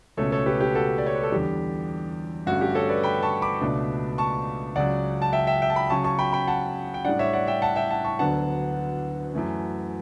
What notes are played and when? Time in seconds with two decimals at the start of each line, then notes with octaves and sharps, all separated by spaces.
0.17 C#2 B2 A3 C#4 A4 C#5
0.32 A4 C#5
0.46 G4 B4
0.61 G4
0.75 F#4 A4
0.98 D5
1.06 C#5
1.15 B4
1.23 A4
1.32 E2 D3 G3 G4
2.47 G2 D3 A3 C#4 F#4
2.61 G4
2.75 A4 C#5
2.89 B4 D5
3.03 G5 B5
3.23 A5 C#6
3.42 B5 D6
3.61 C#2 B2 A3 D4
4.18 A5 C#6
4.76 C#2 C#3 F#3 D5 F#5
5.22 A5
5.33 E5 G5
5.47 E5 G5
5.62 E5 G5
5.70 A5
5.76 G5 B5
5.90 C#3 F#3 C#4 A5 C#6
6.04 A5 C#6
6.19 G5 B5
6.33 G5 B5
6.47 F#5 A5
6.94 G5
7.05 A2 G3 D4 D5 F#5
7.19 C#5 E5
7.33 D5 F#5
7.47 E5 G5
7.62 F#5 A5
7.76 E5 G5
7.91 F#5 A5
8.04 A5 C#6
8.19 D2 D3 F#3 B3 D4 F#5 A5
9.34 F#2 E3 A3 C#4